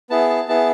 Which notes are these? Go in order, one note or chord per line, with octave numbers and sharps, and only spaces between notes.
B3 E4 G#4 A5
A5
B3 E4 G#4 A5